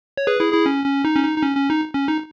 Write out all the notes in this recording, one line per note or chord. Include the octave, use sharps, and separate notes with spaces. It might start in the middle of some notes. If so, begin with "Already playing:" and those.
C#5
G#4 B4
E4 G#4
E4 G#4
C#4
C#4
D#4
C#4
D#4
D#4
C#4
C#4
D#4
C#4
D#4